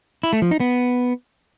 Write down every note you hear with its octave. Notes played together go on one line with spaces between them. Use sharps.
E4
A3
F3
D#4
B3